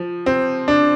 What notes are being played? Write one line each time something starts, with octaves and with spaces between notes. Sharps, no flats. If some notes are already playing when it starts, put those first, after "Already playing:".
Already playing: F3
C4
D4